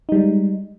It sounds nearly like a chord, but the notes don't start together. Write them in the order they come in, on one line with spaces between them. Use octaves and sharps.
D#4 G3 G#3